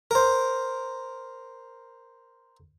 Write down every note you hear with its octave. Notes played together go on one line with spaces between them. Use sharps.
A#4 C5